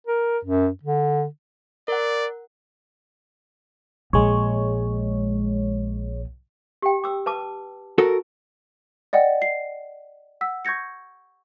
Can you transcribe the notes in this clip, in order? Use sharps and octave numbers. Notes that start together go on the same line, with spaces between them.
A#4
F#2
D3
A#4 D5 F#5
A#1 G#3 C#5
G4 G5
D6 E6
B4 A5 D6
F#4 A4 A#4
D5 D#5 F#5 G5
C7
F#5 E6 B6
C#6 G6 G#6 A#6 C#7